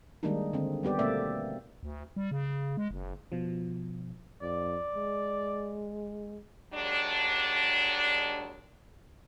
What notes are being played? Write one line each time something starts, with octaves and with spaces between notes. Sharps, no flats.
D#3 G3 G#3 A#3 D4 D#4
D3 C4
G3 B3 G4 D5
B2 A3 A#3 C4 D5 E5
D2
G3
C#3
G#3
F#1
B2 F3
F2 D5
G#3
D#2 F#3 G#3 D4